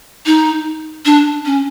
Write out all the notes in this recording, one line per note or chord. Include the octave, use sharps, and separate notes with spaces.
D#4
D4
C#4